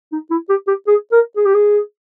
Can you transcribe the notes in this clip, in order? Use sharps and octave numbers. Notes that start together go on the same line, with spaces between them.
D#4
E4
G4
G4
G#4
A#4
G#4
G4
G#4